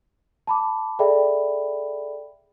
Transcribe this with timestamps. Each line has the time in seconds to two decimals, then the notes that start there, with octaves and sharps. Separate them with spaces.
0.47 A5 B5 D6
0.99 G#4 A4 D5 E5 G5 B5